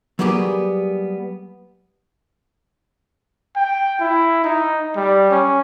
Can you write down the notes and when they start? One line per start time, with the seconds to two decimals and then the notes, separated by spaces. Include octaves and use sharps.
0.19 F#3 G3 A#3 B3 G4 G#4
3.56 G5
4.00 E4
4.44 D#4
4.96 G3
5.31 C#4